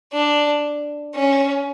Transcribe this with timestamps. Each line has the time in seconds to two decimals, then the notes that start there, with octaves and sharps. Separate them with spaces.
0.13 D4
1.15 C#4